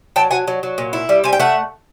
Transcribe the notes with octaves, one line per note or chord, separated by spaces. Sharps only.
F#3 G5 A5
F#3 F#5 G#5
F#3
F#3
A#2
E4
G3
C4 G#5
G5
A3 E5 F#5